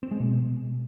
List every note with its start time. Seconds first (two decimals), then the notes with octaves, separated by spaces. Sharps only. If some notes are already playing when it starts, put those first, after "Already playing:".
0.03 C4
0.11 G#3
0.20 B2